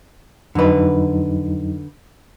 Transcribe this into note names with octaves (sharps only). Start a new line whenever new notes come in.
F2 D3 F#3 D#4 B4